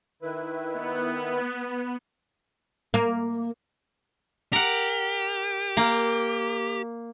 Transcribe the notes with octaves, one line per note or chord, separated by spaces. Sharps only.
D#3 E4 B4
B3
A#3
G4 A#4 F#5
A#3